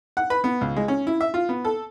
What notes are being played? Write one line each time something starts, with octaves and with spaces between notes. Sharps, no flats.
F#5
B4
B3
C#2
G#3
C#4
E4
E5
F4
B3
A4